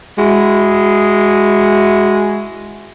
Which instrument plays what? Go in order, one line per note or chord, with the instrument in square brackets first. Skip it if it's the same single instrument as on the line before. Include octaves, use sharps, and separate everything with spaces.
[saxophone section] G#3 E4 F#4